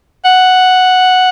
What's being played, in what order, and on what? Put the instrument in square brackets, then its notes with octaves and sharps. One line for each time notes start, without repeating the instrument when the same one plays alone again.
[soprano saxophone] F#5